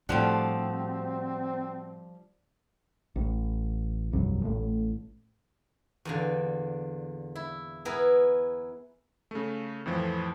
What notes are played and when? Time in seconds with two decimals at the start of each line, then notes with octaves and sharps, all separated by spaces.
0.09 A2 F3 G3 C4 D4 F#4 G4
3.16 A1
4.12 F1 C2 G2 F#3
4.44 A1 A2 A3
6.05 E2 A#2 D3
7.36 E4
7.85 B3 E4 G#4 A#4 B4
9.31 C#3 A3
9.86 F2 A2 E3 F3